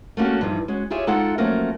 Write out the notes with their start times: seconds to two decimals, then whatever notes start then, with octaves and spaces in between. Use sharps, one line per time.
0.17 A3 A#3 C#4 F#4 G4
0.41 G2 E3 F3 G3 D#4
0.68 G#3 C#4 F#4
0.90 F4 G4 G#4 C#5 E5
1.07 G#3 D#4 F4 A4 F#5 G5
1.38 F3 F#3 A3 A#3 C#4 A#4